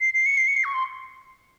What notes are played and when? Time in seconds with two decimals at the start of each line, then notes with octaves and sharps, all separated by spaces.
0.01 C7
0.14 C7
0.26 C#7
0.37 C7
0.47 C#7
0.57 C7
0.64 C#6
0.74 C6